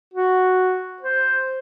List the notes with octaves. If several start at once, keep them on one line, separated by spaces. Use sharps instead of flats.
F#4
C5